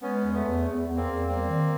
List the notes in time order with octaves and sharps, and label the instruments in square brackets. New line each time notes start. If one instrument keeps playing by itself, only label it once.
[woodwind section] G#3 [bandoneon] B3 C#4
[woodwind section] E2
[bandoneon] A3 B3
[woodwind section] E2
E2
E2
[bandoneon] A#3 C4
[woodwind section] E2
[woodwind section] G3 [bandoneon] A#3 C4
[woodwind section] D#3